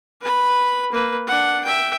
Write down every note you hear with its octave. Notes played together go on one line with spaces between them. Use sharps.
B4 B5
A#3 B4
D4 F#5
E5 G5